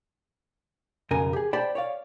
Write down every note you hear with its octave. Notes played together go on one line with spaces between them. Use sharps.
B1 F2 C#3 A#4 G#5
G4 G#4
C5 D5 G5 A5 B5
C#5 D5 F5